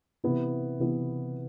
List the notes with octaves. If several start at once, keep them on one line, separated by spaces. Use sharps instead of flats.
C3 E3 B3 E4
C3 E3 B3 E4